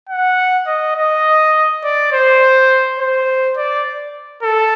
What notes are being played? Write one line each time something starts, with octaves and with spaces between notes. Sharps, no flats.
F#5
D#5
D#5
D5
C5
C5
D5
A4